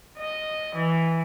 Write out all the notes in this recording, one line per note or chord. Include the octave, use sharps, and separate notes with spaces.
D#5
E3